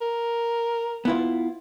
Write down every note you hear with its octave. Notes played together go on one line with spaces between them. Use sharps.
A#4
B3 E4 F4